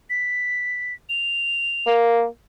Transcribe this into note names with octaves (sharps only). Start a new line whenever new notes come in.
B6
F7
A#3